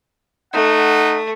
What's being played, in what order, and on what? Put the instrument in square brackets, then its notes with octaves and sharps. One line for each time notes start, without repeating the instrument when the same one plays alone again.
[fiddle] A3 [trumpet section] D#4 F#5